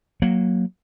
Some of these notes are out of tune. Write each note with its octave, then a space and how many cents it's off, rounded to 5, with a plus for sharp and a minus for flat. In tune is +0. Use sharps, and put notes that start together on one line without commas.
F#3 +0 A#3 +0